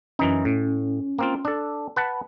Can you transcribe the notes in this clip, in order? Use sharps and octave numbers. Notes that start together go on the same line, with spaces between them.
F#2 E3 C#4 D#4
A2
A#3 C4 F4
D4 A4
B4 F#5 A5